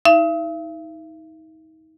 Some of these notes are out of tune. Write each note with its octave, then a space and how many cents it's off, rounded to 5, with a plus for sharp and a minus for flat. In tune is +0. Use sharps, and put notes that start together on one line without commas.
D#4 +35 E5 +45